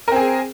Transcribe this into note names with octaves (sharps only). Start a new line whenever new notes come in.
C4 G#4 A#4